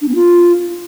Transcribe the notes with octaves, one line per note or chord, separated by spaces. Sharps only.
D4
B3
F4